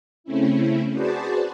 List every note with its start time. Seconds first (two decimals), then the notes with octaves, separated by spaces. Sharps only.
0.24 C#3 A3 C4 C#4 E4
0.92 F#4 G#4 B4 C5 D5 A5